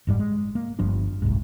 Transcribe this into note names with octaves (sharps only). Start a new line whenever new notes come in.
F#1 G#2 G3
G#3
A#3
G1 G2 F3 D4
F#1 C2 G#2